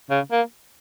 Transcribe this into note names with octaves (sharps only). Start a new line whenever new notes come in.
C#3
A#3